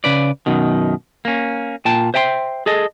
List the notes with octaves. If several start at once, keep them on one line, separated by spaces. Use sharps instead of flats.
C#3 B4 D5
F#2 B2 D#3
A#3 C#4
A#2 G5 A5
C5 E5 G5 A5 C6
G#4 A4 D#5